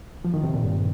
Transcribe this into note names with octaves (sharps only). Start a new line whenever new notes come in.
F3
D#3
C3
A#2
G2